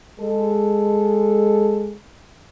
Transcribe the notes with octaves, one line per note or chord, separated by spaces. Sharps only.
G#3 A4